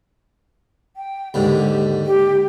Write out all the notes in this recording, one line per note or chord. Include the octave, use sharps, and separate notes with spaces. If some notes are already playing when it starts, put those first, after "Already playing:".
G5
D#2 G#2 D3 G4
G4